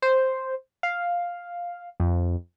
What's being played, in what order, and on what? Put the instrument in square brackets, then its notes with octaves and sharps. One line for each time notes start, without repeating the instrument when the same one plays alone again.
[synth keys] C5
F5
F2